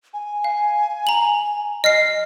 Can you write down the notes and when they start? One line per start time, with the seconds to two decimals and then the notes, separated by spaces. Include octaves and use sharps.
0.14 G#5
0.44 F5
1.07 A#5 F#7
1.84 D#5 F6 C7